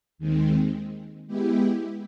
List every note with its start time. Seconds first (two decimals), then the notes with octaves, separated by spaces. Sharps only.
0.18 D#2 D#3 G#3 C4
1.27 G#3 B3 E4 G4